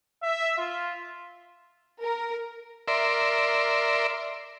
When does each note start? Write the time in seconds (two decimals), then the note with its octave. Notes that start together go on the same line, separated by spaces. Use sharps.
0.24 E5
0.58 F4
2.01 A#4
2.88 A#4 D5 E5 C6